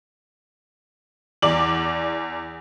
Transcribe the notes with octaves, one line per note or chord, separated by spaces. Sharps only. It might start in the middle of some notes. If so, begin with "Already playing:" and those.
E2 D5 D6 F#7